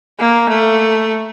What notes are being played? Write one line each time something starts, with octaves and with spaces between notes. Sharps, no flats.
A#3
A3